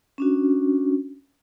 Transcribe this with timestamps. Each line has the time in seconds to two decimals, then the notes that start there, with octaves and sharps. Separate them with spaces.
0.18 C#4 D4 F#4